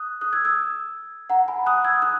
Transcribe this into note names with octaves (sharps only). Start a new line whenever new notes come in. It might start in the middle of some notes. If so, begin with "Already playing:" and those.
Already playing: D#6 F#6
D#6 F#6
E6 G#6
E6 G#6
F#5 A#5
G#5 B5
D#6 F#6
E6 G#6
D#6 F#6